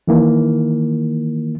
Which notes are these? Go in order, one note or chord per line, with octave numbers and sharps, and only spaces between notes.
D#3 E3 A#3